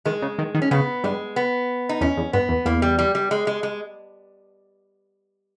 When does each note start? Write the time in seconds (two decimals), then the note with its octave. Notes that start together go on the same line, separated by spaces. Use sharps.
0.05 D#3 G#3
0.22 C#3
0.38 D#3
0.55 D#3
0.62 C#4
0.71 C#3 B3
1.04 G2 G#3
1.36 B3
1.89 D#4
2.01 E2 C#4
2.17 E2
2.33 G2 B3
2.49 E2
2.65 E2 A#3
2.82 G3
2.99 G3
3.15 G3
3.31 G#3
3.47 G#3
3.63 G#3